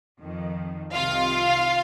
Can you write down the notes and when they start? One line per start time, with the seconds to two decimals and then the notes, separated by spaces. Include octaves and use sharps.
0.21 F2 D#3
0.93 C2 C3 D#3 F4 F5